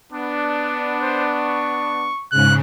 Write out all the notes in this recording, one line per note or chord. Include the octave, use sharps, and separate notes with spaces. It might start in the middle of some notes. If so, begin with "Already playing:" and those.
B3 D4
C5
C#6
G#2 C#3 F#6